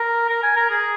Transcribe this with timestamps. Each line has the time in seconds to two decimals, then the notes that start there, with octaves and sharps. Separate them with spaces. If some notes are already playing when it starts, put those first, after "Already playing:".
Already playing: A#4
0.30 A#4
0.43 G#5
0.56 A#4
0.70 G#4